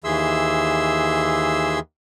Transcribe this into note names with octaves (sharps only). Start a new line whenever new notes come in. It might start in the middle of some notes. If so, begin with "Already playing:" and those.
D#2 E3 G#4 E5 C6 E6